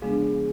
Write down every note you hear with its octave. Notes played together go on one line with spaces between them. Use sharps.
C#3 F3 G#3 B3 D4 G#4
G#4